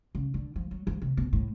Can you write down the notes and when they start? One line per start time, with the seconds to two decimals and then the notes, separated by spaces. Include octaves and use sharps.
0.15 C#3
0.34 D3
0.56 F3
0.71 F#3
0.87 F3
1.02 C3
1.17 B2
1.33 A2